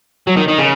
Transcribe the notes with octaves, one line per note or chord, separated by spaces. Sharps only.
F#3
D#3
D#3
C#3